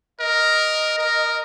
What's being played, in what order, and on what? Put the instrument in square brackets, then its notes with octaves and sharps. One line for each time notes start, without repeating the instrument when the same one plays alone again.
[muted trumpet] A#4 [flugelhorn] D#5
[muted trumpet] A#4